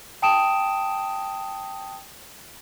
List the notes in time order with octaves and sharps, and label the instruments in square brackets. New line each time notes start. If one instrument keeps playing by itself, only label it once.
[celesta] G5 A5 D#6 D7 E7